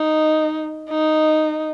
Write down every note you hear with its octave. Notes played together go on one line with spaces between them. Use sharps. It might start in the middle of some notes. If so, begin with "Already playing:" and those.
Already playing: D#4
D#4